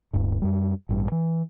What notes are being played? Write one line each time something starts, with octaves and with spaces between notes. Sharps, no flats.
D1 G2
F#2 G3
A1 G2
E3